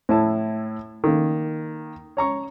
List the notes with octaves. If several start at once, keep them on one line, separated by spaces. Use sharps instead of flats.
A2 E4 A5
D#3 A#3
C#5 A#5 C#6